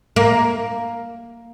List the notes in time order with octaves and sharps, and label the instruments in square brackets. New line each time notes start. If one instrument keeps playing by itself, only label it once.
[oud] A#3